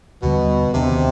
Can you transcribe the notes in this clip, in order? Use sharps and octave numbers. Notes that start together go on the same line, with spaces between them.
D#2 B2 D3 G3
D#2 C3 D#3 B3 D4